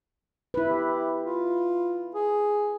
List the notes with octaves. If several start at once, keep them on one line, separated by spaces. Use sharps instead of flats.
E4 B4
G4
F4
G#4